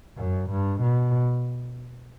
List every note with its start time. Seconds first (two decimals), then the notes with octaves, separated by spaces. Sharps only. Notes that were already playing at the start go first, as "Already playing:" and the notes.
0.18 F#2
0.50 G2
0.81 B2